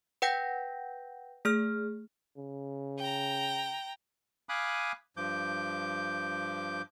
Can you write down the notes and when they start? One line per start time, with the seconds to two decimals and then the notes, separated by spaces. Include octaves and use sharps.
0.22 B4 F#5 G5 G6 A#6
1.45 A3 G#4 F6
2.38 C#3
2.98 G5 A#5
4.49 F5 G#5 B5 D6 D#6 F#6
5.17 G2 F3 D6 G6